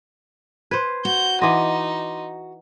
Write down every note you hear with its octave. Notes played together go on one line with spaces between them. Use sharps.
B4 C5 C6 G#6
F#4 G6
E3 D#4 D#5 F#5 C6 D6